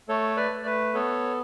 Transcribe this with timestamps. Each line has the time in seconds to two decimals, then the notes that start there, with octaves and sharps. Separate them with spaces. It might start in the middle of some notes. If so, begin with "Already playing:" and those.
0.09 A3 A4 C#5
0.37 B4 D5
0.51 A3
0.66 B4
0.94 B3 A4 C#5